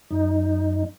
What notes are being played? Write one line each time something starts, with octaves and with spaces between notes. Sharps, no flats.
F#2 D#4